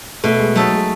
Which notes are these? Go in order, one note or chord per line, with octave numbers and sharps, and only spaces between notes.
B2 A3
G#3
F#3 A3 D#4 A4
G#3